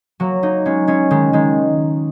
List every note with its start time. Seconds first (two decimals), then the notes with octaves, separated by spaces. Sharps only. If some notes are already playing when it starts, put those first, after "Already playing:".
0.20 F#3 A#3
0.43 A#3 D#4
0.66 G#3 C#4
0.87 G#3 C#4
1.11 D#3 G#3
1.33 D#3 G#3